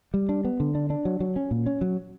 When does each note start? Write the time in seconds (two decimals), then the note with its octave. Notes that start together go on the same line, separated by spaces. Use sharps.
0.14 G3
0.29 D4
0.45 B3
0.60 D3
0.75 D4
0.90 D4
1.05 F#3
1.20 F#3
1.36 C#4
1.51 A#2
1.66 C#4
1.81 F#3